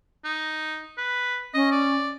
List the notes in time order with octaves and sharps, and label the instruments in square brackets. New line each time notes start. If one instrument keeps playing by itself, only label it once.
[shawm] D#4
B4
[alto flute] C#4 [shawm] D#5
[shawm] D5